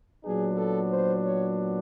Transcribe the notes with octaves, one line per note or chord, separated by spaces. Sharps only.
A#2 F#3 B3 D4 G#4
A4
C5
C#5